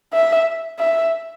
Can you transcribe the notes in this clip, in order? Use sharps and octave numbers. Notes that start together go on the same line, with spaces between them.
E5
E5